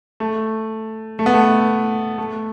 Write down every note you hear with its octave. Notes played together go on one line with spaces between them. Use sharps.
A3
A3
B3
A3
A3